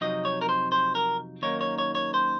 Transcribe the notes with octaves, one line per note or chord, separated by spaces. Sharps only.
F2 C3 F#3 C4 D#4 D#5
C#5
A#4
C5
C5
A#4
F#2 D#3 A#3 D#4 C#5
C#5
C#5
C#5
C5